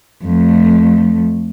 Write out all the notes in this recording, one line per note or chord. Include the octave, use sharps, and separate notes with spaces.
F2 A3